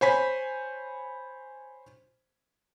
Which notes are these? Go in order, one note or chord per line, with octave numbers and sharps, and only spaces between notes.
C5 C#5 G#5 B5 B6